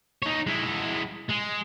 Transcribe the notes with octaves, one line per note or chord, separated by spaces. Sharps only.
D#4 C#5
G#3 E4
G#3